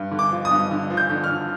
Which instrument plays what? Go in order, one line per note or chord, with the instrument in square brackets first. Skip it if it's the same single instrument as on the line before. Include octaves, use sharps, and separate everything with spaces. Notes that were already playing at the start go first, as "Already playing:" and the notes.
Already playing: [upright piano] G2
D3
D6
F3
D#6
G2
D3
F3
G6
D3
F6
D3